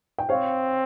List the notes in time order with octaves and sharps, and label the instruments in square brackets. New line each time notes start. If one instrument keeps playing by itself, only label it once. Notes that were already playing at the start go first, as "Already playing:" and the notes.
[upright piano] G5
[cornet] C4 [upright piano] C#5 F5